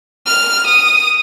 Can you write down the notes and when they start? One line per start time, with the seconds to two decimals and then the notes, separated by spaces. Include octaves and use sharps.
0.27 F6
0.67 D#6